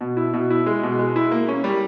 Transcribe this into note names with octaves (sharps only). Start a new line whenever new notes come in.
B2
E4
B2
E4
G#3
B2
G#3
E4
A#3
C#4
G3